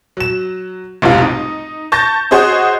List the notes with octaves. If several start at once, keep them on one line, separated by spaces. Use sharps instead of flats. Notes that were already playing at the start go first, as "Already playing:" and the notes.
F#3 E7
F1 B1 G#2 G3 F4
D#4
A5 C#6 G6 A6 A#6
F#4 G#4 C5 C#5 D#5